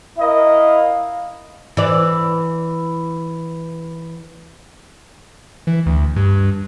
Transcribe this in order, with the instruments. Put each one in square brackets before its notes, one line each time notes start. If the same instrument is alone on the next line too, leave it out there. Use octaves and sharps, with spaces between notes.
[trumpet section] E4 A#4 D#5 [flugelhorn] F5
[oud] E3 D5
[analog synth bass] E3
D2
G2